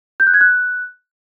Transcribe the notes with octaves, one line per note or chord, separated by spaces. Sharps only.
G6
F#6
G#6
F#6